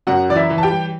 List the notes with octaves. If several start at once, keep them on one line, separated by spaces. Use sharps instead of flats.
F#2 F#4 F#5
E3 D5
E4 E5
E3
A5
G4 G5
G3